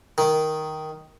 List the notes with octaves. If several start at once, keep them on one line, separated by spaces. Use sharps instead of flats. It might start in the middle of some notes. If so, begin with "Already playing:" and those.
D#3